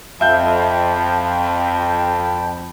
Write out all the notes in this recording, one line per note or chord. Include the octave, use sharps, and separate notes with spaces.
F2 E5 F5 G5 A5 B5 G6